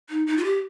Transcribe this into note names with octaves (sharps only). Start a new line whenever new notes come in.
D#4
D#4
F4
G4